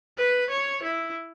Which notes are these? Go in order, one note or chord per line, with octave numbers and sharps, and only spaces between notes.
B4
C#5
E4